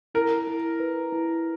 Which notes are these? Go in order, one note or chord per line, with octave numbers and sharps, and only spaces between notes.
E4 A#4
E4
B4
E4